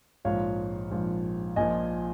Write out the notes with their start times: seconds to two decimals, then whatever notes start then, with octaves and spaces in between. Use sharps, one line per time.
0.25 A#1 G#2 F3 C#5 F5
0.91 A#1 G#2 F3
1.56 A#1 A#2 F3 D#5 G#5